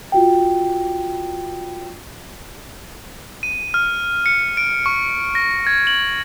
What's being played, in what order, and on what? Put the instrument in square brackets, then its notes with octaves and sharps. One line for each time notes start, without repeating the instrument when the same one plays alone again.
[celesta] F4 F#4 G5
[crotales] D#7
F6
C#7
D7
C#6
A#6
G#6
F#7